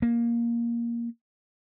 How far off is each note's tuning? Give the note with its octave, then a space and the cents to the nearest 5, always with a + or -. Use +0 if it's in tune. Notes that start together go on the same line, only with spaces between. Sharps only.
A#3 +10